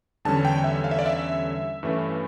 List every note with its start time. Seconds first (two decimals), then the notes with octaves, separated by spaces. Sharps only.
0.25 E2 D3 G3 C#4 A5
0.45 G5
0.64 E5
0.84 F5
0.91 E5
0.99 D5
1.06 E5
1.83 G2 E3 A3 C#4